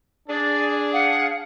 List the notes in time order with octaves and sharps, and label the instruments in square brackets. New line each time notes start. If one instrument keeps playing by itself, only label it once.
[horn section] D4 G#4 [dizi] D5
[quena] F5 [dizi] F#5